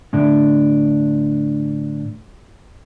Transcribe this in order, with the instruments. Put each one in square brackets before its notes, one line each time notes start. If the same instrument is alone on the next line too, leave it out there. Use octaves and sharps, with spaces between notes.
[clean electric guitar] A2 D3 D4